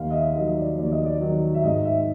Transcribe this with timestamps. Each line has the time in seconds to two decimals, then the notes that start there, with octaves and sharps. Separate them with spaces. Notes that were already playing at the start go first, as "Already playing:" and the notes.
Already playing: D#2 F5
0.10 D#5
0.14 E5
0.36 D#3 F#3 D#5
0.57 D5
0.78 D#2 D5
0.92 D#5
1.05 D5
1.21 D#3 F#3
1.55 E5
1.63 G#2 D#5
1.85 E5